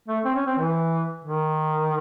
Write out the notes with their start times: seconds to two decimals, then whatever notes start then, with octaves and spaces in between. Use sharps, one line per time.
0.08 A3
0.25 C4
0.35 C#4
0.46 C4
0.58 E3
1.25 D#3